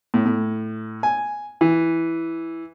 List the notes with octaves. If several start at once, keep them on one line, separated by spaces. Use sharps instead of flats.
A2
A2
G#5
E3